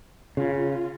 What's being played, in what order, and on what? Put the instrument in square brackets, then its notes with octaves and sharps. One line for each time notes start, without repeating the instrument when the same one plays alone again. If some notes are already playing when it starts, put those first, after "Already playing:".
[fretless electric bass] C#3 [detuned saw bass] F4